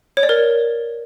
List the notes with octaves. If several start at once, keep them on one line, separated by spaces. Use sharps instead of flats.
C#5
D5
A#4